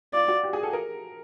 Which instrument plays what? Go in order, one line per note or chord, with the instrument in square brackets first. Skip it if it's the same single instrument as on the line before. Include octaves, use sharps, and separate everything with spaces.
[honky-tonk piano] F4 [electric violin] D5
[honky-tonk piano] F#4
G4
G#4
A4
A#4